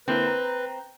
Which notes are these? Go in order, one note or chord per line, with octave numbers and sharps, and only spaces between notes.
D3 A#3 C4 E4 B4
A#5